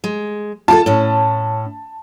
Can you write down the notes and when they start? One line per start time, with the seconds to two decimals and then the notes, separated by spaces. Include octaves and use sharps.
0.04 G#3
0.68 F4 G4 A4 A5
0.86 A2 C#4